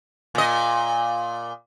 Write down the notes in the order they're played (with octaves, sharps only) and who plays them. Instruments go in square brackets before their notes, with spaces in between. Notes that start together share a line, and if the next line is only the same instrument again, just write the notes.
[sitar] A#2 D#5